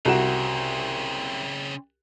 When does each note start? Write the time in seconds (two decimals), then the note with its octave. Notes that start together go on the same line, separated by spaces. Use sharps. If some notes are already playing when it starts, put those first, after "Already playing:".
0.05 C2 C#3 C4 F#4 E7